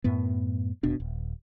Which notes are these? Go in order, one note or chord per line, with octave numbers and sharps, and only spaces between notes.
F#2 A2 B3
F1 B2 D4
D#1